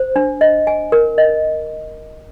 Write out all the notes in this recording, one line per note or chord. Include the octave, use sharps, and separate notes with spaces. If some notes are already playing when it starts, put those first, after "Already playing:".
Already playing: C5
D4
D#5
G#5
A#4
D#5